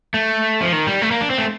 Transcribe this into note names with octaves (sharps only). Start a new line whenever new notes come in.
A3
F3
D#3
G3
A3
A#3
D4
C4
A3